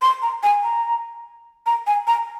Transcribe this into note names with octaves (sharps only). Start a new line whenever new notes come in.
C6
A#5
G#5
A#5
A#5
G#5
A#5